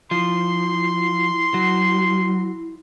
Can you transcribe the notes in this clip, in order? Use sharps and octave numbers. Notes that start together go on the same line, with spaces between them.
F3 E4 C6
F#3